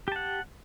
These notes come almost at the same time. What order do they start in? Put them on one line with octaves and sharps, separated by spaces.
G4 A5 F#5